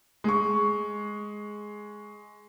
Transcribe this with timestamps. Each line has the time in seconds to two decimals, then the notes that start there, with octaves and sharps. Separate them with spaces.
0.24 G#3 C#6